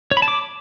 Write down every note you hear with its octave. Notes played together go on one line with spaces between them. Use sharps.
C#5
B5
A5
D6